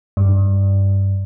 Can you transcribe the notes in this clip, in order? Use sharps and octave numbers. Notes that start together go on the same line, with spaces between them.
G2